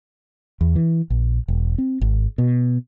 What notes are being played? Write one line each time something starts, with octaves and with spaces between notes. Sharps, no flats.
E2
E3
A#1
E1
C4
G#1
B2